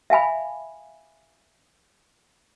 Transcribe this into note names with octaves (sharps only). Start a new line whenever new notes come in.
E5 F5 G#5 B5